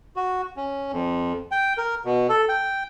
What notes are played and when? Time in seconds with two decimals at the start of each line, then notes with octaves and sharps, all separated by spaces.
0.16 F#4
0.57 C#4
0.92 F2
1.51 G5
1.78 A#4
2.05 B2
2.29 A4
2.49 G5